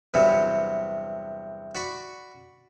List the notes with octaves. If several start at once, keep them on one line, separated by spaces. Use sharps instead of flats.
E2 G2 C3 E3 F#3
F#4 D5 B5 C#6